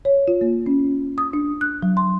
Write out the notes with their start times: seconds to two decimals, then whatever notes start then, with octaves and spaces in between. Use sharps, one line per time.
0.05 C#5
0.28 F4
0.41 A#3
0.66 C#4
1.18 D#6
1.33 D4
1.61 F#6
1.83 F#3
1.97 C6